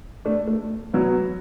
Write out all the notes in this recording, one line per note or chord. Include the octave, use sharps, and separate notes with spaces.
A3 D4
A3
F#3 B3